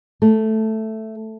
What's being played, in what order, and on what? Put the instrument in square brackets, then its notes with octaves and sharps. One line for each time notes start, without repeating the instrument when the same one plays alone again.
[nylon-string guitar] A3